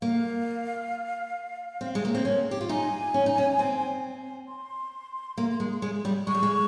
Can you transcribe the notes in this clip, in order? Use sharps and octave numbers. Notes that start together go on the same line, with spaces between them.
A#3 F5
C4
G#3
A#3
C4
C#4
G4
F4
D#4 G#5
C#4
D#4
C#4
C4
C6
A#3
G#3
G#3
G3
G#3 C#6
G3
G#3